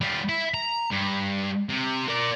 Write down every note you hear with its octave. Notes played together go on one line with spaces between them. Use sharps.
G3 F4
E5 B5
A#5
G2
C3
A#4 D5